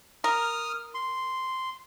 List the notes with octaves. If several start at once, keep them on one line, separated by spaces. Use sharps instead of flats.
A#4 D#6 F6
C6